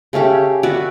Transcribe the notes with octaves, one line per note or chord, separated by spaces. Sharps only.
C#3 A3 C#4 G4
F#4 B4 D5 E5